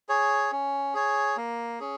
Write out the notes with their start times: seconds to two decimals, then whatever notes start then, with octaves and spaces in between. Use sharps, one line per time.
0.09 G#4 C#5
0.52 C#4
0.94 G#4 C#5
1.37 A#3
1.80 C#4 G#4